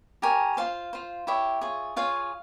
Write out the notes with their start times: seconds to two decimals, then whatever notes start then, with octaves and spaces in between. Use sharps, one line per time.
0.22 G4 A#4 C#5 G#5
0.57 F4 C5 F5
0.93 F4 C5
1.27 E4 G4 C#5 E5
1.61 F4 G#4 C#5
1.96 F4 G#4 C#5 F5